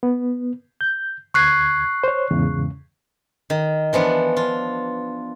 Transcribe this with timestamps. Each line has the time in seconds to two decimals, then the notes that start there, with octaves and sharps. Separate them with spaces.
0.03 B3
0.81 G6
1.34 D2 C#6 F#6 G#6 C7
2.04 C5 C#5
2.31 E2 G#2 C#3
3.50 D#3
3.93 E3 F3 B3 D4
4.36 F4